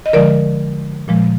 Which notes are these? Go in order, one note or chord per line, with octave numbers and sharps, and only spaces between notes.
D#5
D3 F3 G#3 A#4 D5
A#2 F3 G#3